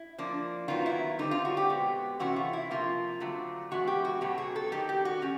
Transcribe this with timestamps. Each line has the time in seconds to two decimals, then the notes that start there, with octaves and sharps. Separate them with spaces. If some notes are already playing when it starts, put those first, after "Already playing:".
Already playing: E4
0.19 F3 A#3 D4
0.68 D#3 F#3 B3 F4
0.86 E4
1.19 D3 G3 C4 D#4
1.31 F4
1.45 F#4
1.57 G4
1.70 B2 G#3 B3
2.20 C3 E3 A3 C#4 F#4
2.36 F4
2.53 E4
2.70 C3 F3 A#3 F4
3.20 D3 F#3 A3 C4
3.71 A2 E3 G#3 B3 F#4
3.87 G4
4.05 F#4
4.21 B2 F#3 A3 G4
4.38 G#4
4.56 A4
4.72 D#3 G3 A#3 G4
4.89 G4
5.05 F#4
5.22 G3 C#4